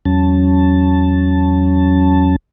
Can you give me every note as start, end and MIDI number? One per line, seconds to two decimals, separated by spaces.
0.05 2.36 40
0.05 2.36 54
0.05 2.36 61
0.05 2.36 81